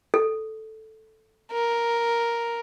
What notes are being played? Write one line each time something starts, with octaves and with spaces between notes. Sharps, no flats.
A4
A#4